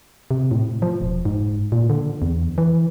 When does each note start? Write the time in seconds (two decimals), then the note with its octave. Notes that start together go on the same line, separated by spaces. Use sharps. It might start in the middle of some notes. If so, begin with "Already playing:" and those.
0.31 C3
0.51 A2
0.82 F3
1.02 E1
1.25 G#2
1.72 A#2
1.90 D3
2.22 E2
2.58 E3